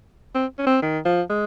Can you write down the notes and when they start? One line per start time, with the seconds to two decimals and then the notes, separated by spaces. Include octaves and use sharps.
0.35 C4
0.58 C#4
0.66 C4
0.82 D#3
1.05 F3
1.30 G#3